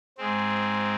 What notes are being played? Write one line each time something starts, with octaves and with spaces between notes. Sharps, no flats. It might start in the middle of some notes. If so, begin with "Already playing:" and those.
G#2 G#3 C4